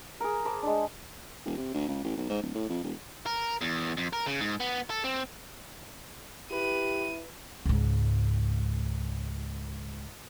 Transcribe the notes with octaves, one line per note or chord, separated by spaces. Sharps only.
G#4 A#4
C5 A5 B5 D6
G#3 D4
E1
C3
D2
C#2
A1
B1
G#2
D1
A2
F2
E1
A#4
E2
F2
A#4
C#3
G#2
B3
A4
C4
E4 G4 B4 D#7
C#2 G#2